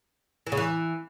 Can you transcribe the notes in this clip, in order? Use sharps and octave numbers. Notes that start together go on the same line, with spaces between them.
E3
C#3
E3